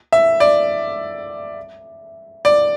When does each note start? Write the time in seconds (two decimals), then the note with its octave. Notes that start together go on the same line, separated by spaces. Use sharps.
0.13 E5
0.40 D5
2.45 D5